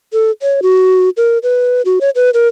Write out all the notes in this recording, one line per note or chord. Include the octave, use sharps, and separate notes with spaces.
A4
C#5
F#4
A#4
B4
F#4
C#5
B4
A#4